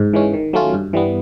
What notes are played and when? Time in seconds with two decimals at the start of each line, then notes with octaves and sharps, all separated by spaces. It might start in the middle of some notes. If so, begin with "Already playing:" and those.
Already playing: G#2
0.13 E3 G#3 C#4
0.33 D#3
0.53 F#3 A3 C#4 F4
0.74 G2
0.93 E3 G3 B3